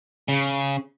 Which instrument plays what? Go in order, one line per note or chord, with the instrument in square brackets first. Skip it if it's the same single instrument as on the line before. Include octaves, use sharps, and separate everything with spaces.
[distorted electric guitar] C#3